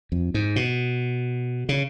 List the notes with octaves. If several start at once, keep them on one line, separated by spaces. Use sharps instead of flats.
F2
G#2
B2
C#3